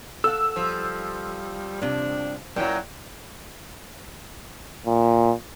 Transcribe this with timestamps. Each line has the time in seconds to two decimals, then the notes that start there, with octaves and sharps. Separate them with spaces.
0.24 A4 F5 F#5 E6
0.56 F3 G3
1.82 G2 C3 D4
2.56 F#2 A#2 F#3 E4 G5
4.86 A#2